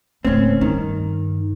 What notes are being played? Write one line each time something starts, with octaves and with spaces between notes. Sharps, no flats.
D1 A3 C4 C#4
G2 D#3